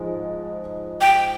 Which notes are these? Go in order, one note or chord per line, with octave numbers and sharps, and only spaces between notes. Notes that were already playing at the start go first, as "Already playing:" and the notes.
Already playing: G#2 F3 G#3
G5